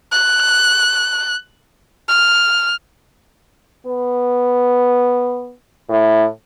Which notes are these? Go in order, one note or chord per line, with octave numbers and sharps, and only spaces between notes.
F#6
F6
B3
A2